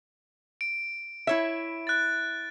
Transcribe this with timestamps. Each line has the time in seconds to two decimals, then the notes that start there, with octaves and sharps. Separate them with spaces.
0.61 D7
1.27 E4 C#5 E5
1.87 F#6 A6